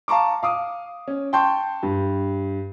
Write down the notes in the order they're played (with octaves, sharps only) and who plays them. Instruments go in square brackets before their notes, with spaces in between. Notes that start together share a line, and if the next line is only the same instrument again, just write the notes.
[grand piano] F5 A5 A#5 C#6 D6
F5 D6 D#6
C#4
G5 A5 C6 C#6 G6
G2